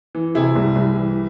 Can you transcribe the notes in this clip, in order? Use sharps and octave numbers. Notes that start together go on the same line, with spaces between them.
E3
C3 E4 G#4
C2
C2
E3